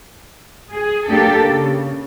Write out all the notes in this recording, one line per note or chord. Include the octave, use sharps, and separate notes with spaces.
G#4
A#3 D4 G4 A4
C#3